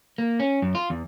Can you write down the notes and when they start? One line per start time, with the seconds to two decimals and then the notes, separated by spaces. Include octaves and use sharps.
0.18 A#3
0.40 C#4
0.62 F#2
0.75 F4
0.90 E2